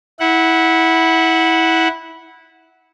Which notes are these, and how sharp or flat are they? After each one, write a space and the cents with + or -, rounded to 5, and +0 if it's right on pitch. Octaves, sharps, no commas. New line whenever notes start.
E4 -15 F#5 +0